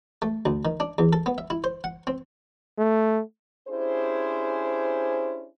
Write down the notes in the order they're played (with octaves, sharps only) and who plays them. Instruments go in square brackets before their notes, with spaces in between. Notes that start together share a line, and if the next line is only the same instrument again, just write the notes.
[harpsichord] A3
D2
D#3
D4
E2
A4
B3
E5
E4
C5
F#5
C4
[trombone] A3
[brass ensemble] C#4 D4 E4 G4 G#4 C5